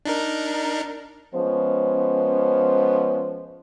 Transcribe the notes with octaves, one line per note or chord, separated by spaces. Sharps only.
D4 D#4 A#4
F3 G#3 B3 C#4 C5